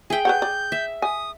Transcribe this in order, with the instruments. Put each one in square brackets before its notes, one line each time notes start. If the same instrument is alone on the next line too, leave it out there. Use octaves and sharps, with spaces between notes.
[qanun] G#4 G5 [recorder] E5
[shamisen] B4 C#5 F#5 [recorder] G6
[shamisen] D5
[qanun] E5
[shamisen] G#5 [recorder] D#6